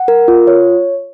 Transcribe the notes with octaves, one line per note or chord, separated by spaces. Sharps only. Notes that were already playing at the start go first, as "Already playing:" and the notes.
Already playing: F#5
A#4
F4
C#5